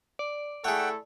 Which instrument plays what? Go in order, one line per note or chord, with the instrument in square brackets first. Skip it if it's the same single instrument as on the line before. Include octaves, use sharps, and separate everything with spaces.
[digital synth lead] D5
[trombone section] A3 E4 A4 [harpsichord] G#4 C#5 [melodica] F#5 G5